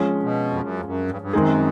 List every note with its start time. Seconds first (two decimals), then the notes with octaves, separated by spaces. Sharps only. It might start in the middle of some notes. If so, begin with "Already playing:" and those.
Already playing: F3 G#3 C#4
0.23 B2
0.51 F2
0.61 F#2
0.80 F2
0.85 F#2
1.10 G2
1.21 G2
1.33 F#2 D#3 G#3 C4 D#4 G#4